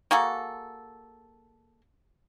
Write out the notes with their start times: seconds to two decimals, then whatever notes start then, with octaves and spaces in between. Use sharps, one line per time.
0.11 A#3 F#4 G#4 A4